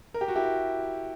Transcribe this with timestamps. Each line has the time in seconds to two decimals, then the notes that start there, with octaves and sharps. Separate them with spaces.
0.14 A#4
0.21 G4
0.28 F#4
0.35 E4 G4